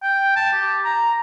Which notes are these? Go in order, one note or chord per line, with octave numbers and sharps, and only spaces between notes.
G5
A5
G4
A#5